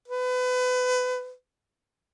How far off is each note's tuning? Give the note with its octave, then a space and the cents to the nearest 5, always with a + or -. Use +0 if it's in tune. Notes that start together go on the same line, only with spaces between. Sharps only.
B4 +30